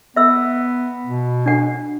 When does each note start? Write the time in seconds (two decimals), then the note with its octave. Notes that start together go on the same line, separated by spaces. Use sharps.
0.16 B3 E5 E6
1.07 B2
1.46 D4 F#5